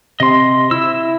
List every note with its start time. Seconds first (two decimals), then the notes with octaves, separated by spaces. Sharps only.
0.20 C3 D#5 C6
0.71 E4 E6